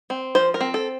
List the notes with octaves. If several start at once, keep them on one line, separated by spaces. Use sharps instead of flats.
C4
F3 C5
A#4
C4
A4